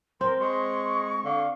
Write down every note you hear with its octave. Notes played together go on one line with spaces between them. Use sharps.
C4 A#4 C6
G#3 C#6
D3 F5